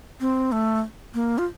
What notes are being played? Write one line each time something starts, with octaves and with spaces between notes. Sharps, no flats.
C4
A3
A#3
F4